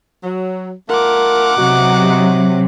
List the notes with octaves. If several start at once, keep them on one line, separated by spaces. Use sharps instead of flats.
F#3
A3 F4 A#4 F#5 D6
C3 F#3 B3 D#4 F#4